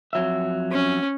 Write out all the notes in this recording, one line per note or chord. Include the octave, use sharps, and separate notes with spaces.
F2 F#3 E5
C#4